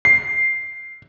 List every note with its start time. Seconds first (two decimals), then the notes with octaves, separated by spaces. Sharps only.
0.05 C7